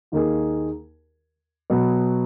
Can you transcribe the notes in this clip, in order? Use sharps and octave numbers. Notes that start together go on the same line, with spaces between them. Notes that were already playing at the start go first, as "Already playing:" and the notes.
D#2 D#3 A#3 D#4 G#4
B2 F#3 B3